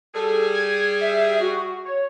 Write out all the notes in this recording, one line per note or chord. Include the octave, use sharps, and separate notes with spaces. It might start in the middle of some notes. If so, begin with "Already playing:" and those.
G3 G#4 A4
G#6
E5
F#4
C#5